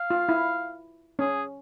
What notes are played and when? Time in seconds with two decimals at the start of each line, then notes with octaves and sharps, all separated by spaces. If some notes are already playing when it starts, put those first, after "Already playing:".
Already playing: F5
0.10 F4
0.29 E4
1.19 C#4 G#4